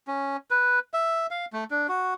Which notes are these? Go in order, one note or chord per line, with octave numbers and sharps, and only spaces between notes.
C#4
B4
E5
F5
A3
D4
F#4